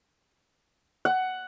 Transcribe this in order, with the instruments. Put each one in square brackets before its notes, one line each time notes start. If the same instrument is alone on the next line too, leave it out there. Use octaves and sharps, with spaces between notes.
[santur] F#5